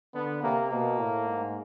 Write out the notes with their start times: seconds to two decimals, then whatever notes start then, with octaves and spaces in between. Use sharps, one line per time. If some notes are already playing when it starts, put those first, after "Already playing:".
0.14 D3 B3
0.42 C3 A#3
0.71 B2 A#3
0.98 A2
1.27 G#2